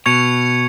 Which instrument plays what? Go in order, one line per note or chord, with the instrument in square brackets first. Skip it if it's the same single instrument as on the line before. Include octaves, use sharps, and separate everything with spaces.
[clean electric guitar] B2 [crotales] C#6 G#6 C#7 F7